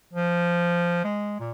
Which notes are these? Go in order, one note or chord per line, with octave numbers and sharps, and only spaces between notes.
F3
G#3
A#2